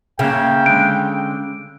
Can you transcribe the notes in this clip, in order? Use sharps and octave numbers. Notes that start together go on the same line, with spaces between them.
C#3 A#3 C#4 E5 G5
D3 G#3 D7